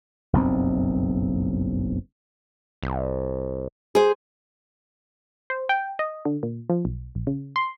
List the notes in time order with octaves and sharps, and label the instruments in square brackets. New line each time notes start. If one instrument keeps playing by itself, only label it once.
[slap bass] F#1 B1 G2 C4
[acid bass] C2
[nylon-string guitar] G#4 C5
[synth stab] C5
G5
D#5
D3
A#2
F3
B1
A#1
C#3
C6